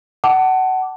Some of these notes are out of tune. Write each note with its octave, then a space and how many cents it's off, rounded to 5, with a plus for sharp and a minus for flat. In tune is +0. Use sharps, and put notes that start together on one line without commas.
F#5 +20 A5 +0 D6 +0